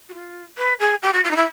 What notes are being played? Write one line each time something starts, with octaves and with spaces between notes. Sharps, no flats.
F#4
F4
B4
G#4
G4
F#4
F4
D#4
E4